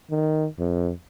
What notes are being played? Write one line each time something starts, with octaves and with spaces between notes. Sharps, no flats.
D#3
F2